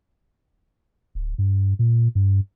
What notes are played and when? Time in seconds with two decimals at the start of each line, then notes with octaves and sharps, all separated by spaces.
1.15 D1
1.38 G2
1.79 A#2
2.15 G2